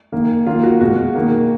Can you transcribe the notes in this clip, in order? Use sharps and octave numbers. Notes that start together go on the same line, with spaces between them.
D#3 A#3
D#3 A#3 F4
F#4
B2 G#3 F#4
D#3 A#3